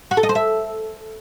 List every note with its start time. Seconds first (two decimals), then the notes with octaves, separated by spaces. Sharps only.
0.11 F#4
0.17 A4
0.23 D#5
0.29 C5
0.35 E5